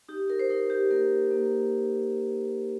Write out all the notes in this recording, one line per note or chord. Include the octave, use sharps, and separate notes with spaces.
D#4 G4
A#4
C5
D#4 A#4
G4
A#3 A#4
A#3